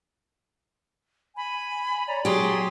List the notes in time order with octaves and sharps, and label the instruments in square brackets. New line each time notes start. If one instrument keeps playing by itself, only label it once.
[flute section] G#5 B5
C#5 D5 A#5
[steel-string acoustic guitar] F#3 G4 [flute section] G#4 C6 D#6